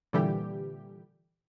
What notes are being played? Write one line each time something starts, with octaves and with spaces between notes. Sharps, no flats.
A#2 D3 E3 G3 G4